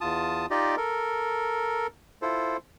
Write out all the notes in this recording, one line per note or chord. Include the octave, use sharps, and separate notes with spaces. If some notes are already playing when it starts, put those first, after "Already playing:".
E2 F4 A5 D#6
D#4 F4 G4 D5 D#5
A4 A#4
E4 F4 A4 C5